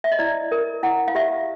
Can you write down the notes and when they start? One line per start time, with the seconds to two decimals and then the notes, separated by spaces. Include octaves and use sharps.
0.04 E5
0.12 D#5
0.19 E4 D5
0.52 A#4
0.83 E4 F#5
1.08 F5
1.15 G4 E5